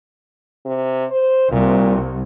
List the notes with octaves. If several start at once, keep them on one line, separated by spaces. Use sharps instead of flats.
C3
C5
C2 A#2